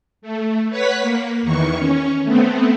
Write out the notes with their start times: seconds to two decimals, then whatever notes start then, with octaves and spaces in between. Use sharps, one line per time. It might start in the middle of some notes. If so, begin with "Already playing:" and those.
0.22 A3
0.70 B4 C#5 F#5 B6
1.01 A#3
1.42 E2 D#3 E3 C#6
1.77 C#4
2.23 A3 B3 C4